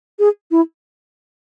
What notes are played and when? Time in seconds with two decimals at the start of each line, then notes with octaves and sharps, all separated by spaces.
0.19 G#4
0.51 E4